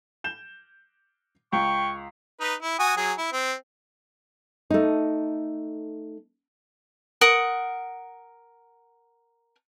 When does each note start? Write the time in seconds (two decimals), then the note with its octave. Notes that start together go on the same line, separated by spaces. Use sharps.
0.24 G6 E7 G7
1.53 C#2 G5 C#6
2.41 D#4 B4
2.62 E4
2.79 F#4 G#5 D#6
2.97 F#3 G#4
3.18 E4
3.32 C4
4.70 A3 D#4
7.21 A#4 F#5 D#6